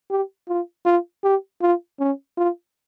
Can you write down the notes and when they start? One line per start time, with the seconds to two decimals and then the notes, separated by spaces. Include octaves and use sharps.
0.10 G4
0.48 F4
0.86 F4
1.24 G4
1.62 F4
2.00 C#4
2.37 F4